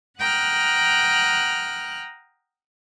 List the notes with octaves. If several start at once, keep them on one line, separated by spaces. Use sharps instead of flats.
F#5 G5 A#5 D#6 F6 F#6